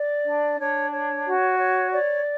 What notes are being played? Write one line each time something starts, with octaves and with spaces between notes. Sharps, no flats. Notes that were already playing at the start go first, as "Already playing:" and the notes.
Already playing: D5
D4
D4 C#5
C#5
F#4
C#5
C#5 D5